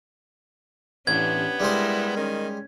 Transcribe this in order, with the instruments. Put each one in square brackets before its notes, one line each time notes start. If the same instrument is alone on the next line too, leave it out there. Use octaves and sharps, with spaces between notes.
[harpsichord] A1 [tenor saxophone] B3 [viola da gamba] C#4 D4 G4 [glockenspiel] G#6
[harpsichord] G3 G#3 C5 [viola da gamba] E4 A#4
[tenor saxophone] D#3 [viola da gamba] C#4